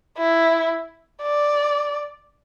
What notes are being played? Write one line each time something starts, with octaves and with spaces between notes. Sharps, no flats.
E4
D5